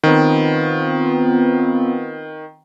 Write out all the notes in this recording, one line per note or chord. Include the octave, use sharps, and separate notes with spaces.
D#3 B3 C4 F4